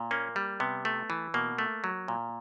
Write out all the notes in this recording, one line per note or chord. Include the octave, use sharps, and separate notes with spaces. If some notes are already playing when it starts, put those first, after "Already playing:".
Already playing: A#2
A#3 C#4
G3
C3 B3
A3
E3
B2 A#3
A3
F#3
A#2